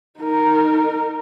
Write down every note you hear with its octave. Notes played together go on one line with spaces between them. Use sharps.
D#4 A#4